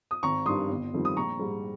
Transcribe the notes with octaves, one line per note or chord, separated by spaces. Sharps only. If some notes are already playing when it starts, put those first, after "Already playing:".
D#6
G#1 A#5 C#6
G2 D#3 G3 C6 D#6
G1
F2 D#3 G3
D#6
A#1 A#5 C#6
G#2 G3